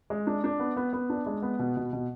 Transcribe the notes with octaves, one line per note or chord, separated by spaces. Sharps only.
G#3
D4
D4
B3
B3
B3
D4
G#3
B3
B2
B2
B2